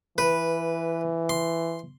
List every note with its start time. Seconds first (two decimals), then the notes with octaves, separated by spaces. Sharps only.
0.18 E3 B4
1.29 C6